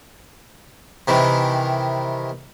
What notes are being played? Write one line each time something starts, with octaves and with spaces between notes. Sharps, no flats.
C3 D#3 E3